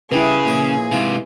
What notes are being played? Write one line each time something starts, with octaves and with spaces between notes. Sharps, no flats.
C#3 G3 E4 G#4 B4
A#1 A#2 C#5
G#2 C3 E3 F4